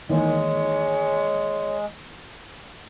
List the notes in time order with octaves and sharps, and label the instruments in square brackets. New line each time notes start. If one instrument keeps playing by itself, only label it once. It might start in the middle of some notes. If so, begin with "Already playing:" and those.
[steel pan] D#3 E3 A#3 [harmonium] G#3 [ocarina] C#5